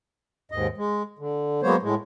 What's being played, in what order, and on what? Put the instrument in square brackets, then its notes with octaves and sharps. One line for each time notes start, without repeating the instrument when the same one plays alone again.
[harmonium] D#2 G#2 D#5
G#3
D3
F#3 G#3 A#3 B3 C5 C#5
A2 G#3